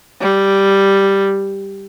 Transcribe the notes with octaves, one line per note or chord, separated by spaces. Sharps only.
G3